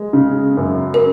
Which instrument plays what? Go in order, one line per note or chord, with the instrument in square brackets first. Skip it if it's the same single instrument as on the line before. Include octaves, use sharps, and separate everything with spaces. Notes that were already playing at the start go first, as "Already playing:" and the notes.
Already playing: [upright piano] G#3
C#3
F#2
[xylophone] A#4